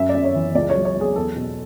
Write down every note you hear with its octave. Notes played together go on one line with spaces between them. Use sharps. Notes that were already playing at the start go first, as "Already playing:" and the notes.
Already playing: F#2 E5
D5
F#2
C#5
E3
C#2 D5
C#5
F#3
C#5
F#3
G#4
E2 A4
B2